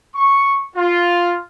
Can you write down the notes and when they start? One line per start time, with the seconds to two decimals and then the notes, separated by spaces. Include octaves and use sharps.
0.16 C#6
0.76 F4